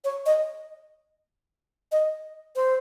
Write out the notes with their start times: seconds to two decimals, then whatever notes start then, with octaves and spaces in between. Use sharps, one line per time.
0.04 C#5
0.26 D#5
1.92 D#5
2.56 C5